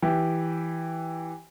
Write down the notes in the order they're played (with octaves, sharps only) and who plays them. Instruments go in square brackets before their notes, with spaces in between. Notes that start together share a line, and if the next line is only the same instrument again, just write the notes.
[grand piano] E3 G4 G5